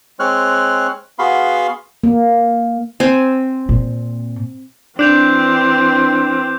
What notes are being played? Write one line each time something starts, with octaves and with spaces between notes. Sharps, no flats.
G#3 C4 C#5 F6 F#6
B3 F#4 G#4 F5 B5 C6
A#3
C4 G#5
A#2
E3 C4 D4 D6 G6 F7